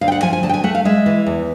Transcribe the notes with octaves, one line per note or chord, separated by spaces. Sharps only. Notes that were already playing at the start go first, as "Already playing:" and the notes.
D2 F5
G5
F#5
F3 G#5
G#5
D2 A5
G5
G#5
A3 F#5
F5
G#3 E5
E3
E2